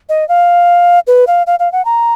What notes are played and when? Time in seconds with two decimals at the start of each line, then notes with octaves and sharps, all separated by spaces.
0.09 D#5
0.29 F5
1.07 B4
1.27 F5
1.47 F5
1.59 F5
1.72 F#5
1.85 A#5